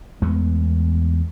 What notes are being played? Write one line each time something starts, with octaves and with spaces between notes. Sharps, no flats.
E2 G#3 A3 B3